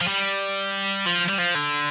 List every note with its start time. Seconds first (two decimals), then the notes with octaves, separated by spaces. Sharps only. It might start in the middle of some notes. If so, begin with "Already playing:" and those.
0.01 F3
0.08 G3
1.06 F3
1.29 G3
1.39 F3
1.55 D3